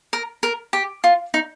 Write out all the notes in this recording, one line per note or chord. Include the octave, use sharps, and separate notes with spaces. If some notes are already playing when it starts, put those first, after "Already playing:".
A#4
A#4
G4
F4
D#4